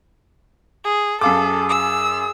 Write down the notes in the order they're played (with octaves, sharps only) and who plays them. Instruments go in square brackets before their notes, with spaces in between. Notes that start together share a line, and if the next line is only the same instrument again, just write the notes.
[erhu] G#4
[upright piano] F#2 F5 D6 [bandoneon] G#4 [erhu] A4
[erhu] E6